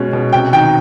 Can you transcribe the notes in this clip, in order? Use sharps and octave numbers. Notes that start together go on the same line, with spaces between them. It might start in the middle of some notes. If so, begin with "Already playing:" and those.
Already playing: B2 G#3 C#4
B2
C3 G5
D#3 G5